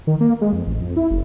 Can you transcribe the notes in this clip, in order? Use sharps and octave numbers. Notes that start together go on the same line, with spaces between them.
D#3
A#3
G#3
F2
A1
F2
E4
F#1